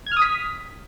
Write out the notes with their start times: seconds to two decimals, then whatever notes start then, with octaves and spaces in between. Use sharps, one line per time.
0.06 G#6
0.12 F6
0.17 D#6
0.22 B6